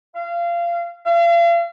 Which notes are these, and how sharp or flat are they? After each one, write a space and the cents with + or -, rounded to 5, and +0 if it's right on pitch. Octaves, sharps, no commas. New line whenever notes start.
F5 -25
F5 -40